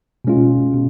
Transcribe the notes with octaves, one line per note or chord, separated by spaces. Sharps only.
B2 G#3 C#4 F4
B2